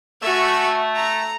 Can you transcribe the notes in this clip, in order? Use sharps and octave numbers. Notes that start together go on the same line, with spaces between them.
A3 F#4 E5 G#5
A#5